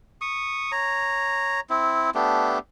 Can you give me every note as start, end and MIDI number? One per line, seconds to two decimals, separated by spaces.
0.21 0.72 85
0.21 0.72 87
0.72 1.60 73
0.72 1.60 82
1.70 2.10 60
1.70 2.10 64
2.15 2.59 57
2.15 2.59 59
2.15 2.59 62
2.15 2.59 67